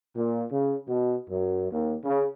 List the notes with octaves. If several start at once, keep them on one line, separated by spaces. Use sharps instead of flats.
A#2
C#3
B2
F#2
D#2
C#3